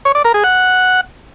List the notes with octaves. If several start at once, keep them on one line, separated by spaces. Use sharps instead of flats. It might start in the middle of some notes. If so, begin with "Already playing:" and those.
C#5
D5
A#4
G#4
F#5